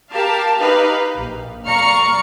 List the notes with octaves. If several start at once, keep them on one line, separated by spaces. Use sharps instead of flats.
G4 A#4 F5 A5
D#4 G4 B4 F5
A#1
D5 F5 A#5 C#6 F6 C#7